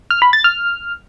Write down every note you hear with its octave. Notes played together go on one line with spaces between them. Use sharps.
F6
B5
A6
F6